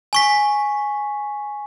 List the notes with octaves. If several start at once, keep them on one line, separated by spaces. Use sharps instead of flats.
G#5 C#6 B6